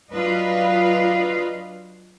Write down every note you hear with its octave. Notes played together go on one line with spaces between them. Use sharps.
F#3 D4 F4 B4 D#5 F5